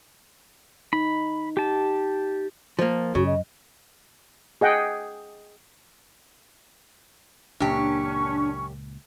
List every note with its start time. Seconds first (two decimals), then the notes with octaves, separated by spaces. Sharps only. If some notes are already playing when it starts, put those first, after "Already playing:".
0.93 D#4 B5
1.57 G4 A5
2.79 F3 A#3
3.15 F#2 C#3 F#4
3.26 D#5
4.61 G#4 D#5 F#5 G5
7.60 C#2 F#2 A#2 A#3 C#4 D4 G4 C#6